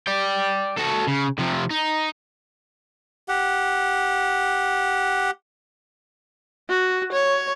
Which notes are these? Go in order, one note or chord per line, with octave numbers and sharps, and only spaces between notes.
D5 G5
F#4 A4
C#3
C3 F3
D#4
G4 F#5
F#4
C#5